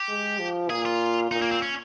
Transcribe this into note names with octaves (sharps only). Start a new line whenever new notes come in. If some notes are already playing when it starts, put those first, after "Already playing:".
Already playing: G4
G#3
F3
A#2 G#4
F4
A#2 D#4
A#3
C4
C#4